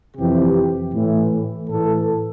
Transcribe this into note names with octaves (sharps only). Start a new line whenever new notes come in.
F2 C3 E3 G4
A2 E3
A2 E3 A4